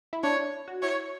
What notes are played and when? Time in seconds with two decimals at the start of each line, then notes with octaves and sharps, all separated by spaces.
0.13 E4
0.23 D4 C#5
0.68 F#4
0.82 E4 C#5